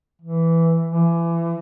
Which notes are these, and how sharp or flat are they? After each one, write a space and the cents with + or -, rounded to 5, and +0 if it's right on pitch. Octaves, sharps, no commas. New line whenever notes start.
E3 +5
E3 +30